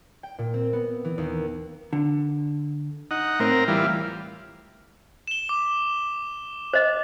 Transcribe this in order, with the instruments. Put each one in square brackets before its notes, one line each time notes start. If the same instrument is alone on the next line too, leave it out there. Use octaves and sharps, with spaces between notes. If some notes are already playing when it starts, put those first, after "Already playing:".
[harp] G5
A#2
C4
B3
E3
D#2
[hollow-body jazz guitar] D3
[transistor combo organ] D#4 F#5
[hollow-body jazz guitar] A2 [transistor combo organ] C4 A#4
[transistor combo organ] E3 G3 F4
[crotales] E7 G7
D6
[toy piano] C5 D#5